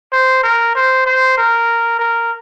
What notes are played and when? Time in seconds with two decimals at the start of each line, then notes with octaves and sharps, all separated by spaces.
0.12 C5
0.43 A#4
0.75 C5
1.06 C5
1.37 A#4
1.99 A#4